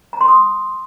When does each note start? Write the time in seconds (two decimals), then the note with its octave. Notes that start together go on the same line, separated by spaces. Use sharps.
0.13 A#5
0.21 C6
0.28 D#6